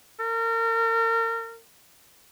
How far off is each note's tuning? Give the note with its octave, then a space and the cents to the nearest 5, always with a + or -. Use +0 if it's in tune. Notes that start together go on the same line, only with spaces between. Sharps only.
A#4 -35